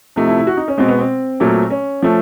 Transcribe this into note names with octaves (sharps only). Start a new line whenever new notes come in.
C3 F3 A3 D#4
E4
E4
F#4
D#4
C#4
B2 G#3 C4
B3
C4
A#2 F#3 A3
C#4
F3 A3